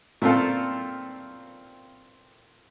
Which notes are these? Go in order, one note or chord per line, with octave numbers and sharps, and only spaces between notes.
A#2 A3 C4 F4 A4